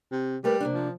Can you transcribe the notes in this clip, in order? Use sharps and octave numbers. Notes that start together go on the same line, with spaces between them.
C3
G3 A3 A#4 B4
C3 A#3 D4
F3